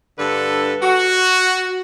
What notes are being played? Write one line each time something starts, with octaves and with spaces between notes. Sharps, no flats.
G2 D3 A4 B4
F#4